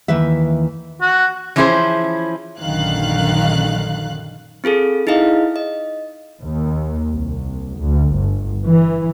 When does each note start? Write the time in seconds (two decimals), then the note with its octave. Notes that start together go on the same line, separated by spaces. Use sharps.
0.08 D#2 D#3 E3 B4 E5
1.01 F#4
1.56 E3 F3 C#4 E4 G#4 C5
2.60 A#1 F#2 D3 D#3 F5 F#6
4.64 C4 F4 G#4 A4
5.07 D#4 E4 G#4 D#5 F5
5.56 D#5
6.41 D#2
7.11 C2
7.78 D2
8.15 G1
8.67 E3